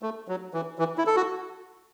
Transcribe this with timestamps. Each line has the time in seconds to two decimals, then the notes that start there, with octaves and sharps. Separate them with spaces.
0.02 A3
0.28 F#3
0.54 E3
0.79 E3
0.98 E4
1.07 A4
1.16 F#4